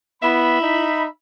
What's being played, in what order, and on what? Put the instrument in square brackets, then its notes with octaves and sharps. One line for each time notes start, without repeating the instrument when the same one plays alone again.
[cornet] B3 [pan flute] E4 [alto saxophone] E5 [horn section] B5
[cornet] D#4